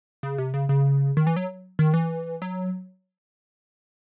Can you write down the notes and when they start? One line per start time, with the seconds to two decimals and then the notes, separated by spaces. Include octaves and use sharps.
0.23 C#3
0.38 C3
0.54 C#3
0.69 C#3
1.17 D#3
1.27 E3
1.37 F#3
1.79 D#3
1.94 E3
2.42 F#3